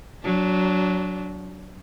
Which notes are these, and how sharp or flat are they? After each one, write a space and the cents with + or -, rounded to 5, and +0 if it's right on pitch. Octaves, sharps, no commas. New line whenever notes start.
F#3 +0 D4 -25